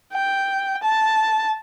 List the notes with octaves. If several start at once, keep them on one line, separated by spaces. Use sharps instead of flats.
G5
A5